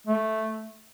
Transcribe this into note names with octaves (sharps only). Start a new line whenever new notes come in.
A3